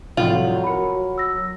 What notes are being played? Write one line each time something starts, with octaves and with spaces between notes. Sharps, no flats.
C2 A2 F3 F#3 F4 F#5 F#7
F#4 A#4 B5 C#7
E6 A#6